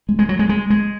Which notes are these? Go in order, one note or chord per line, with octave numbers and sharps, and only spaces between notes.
G#3
G#3
F#3
G#3
G#3
G#3